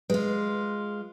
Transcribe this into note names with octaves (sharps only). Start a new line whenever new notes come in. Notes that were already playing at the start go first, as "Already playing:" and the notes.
G#3 F4 B4